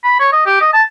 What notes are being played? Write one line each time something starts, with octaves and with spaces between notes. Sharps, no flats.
B5
C#5
D#5
G4
D#5
A5